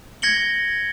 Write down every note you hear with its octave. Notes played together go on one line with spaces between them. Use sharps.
G#6 A#6 C#7 F#7 G7